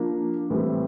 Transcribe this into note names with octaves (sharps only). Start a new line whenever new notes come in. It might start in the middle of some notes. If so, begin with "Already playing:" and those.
Already playing: F3 A#3 D4
A2 E3 G3 C4